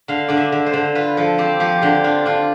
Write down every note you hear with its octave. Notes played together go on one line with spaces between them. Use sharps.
D3 F5
D3 D5
E5
D3
C5
D3
F4 B4
F3 A4
C4 G4
F3 G4
D3 G4
D4 F4
D4 F4